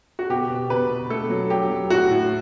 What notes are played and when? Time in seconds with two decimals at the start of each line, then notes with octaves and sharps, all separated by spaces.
0.19 F#4
0.30 B2 G4
0.50 B2
0.70 B2 B4
0.90 B2
1.10 A3 A4
1.30 F#3
1.50 F#3 G4
1.70 F#3
1.90 A2 F#4
2.11 A2